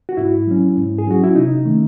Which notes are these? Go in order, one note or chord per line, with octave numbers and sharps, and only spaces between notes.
F#4
G#2 E4
F#3 C#4
G#2
G#4
F#3 C#4 F#4
E4
C3 D#4
D#3 A3 C#4